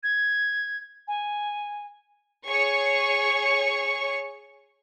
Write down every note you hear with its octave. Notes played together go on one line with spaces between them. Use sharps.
G#6
G#5
G#4 C#5 C#6